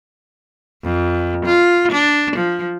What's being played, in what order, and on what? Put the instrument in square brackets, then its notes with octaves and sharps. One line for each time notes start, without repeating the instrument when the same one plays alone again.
[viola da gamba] F2
F4
D4
F3